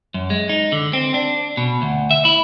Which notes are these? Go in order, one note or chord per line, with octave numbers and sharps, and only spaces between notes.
F#2
G#3
D#4
D3
C4
D4
B2
D2
E5
E4